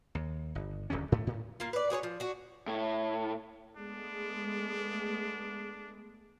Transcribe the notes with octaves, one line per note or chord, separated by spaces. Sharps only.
D#2
G1
D1 B1 D3 C#4
G#2 A3
A2
A#3 F4
B4 D5
F#4 G#4 B4 C#5
F3
D4 F#4
A2
G#3 A3 B3 D4